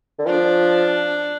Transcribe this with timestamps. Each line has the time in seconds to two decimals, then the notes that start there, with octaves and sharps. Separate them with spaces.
0.19 D3
0.26 F3 D4